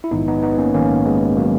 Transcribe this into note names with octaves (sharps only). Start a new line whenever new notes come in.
E4
A#1 G#2 D#3 B3 D#4
B3 D#4
B3 D#4
A#3 C#4
A#1 G#2 D#3 A#3 C#4
G#3 B3
D#3 F#3 A#3